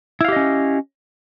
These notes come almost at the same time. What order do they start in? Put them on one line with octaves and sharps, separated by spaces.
E4 F5 G4 D#5 C#4